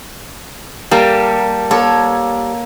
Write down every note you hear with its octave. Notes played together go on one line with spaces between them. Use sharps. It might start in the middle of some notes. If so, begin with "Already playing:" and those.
G3 A#3 G4 A4
A#3 A4 C#5